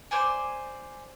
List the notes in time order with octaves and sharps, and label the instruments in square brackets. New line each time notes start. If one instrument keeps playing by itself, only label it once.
[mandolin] C5 D5 G#5